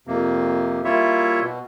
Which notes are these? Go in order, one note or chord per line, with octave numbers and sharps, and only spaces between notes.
F2 C3 A#3
G3 A#3 E4 F4 C#5 E5
B2